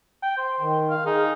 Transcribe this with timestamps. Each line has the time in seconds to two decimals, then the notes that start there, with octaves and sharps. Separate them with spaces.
0.23 G5
0.38 C5
0.60 D#3
0.90 F5
1.06 D#4 G#4